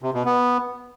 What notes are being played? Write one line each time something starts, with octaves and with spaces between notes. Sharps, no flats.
C3
B2
B3